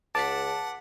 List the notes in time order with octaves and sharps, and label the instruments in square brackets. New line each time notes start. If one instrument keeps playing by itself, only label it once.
[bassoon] C#2 [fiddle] F#5 [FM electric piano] A5 [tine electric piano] D6 B6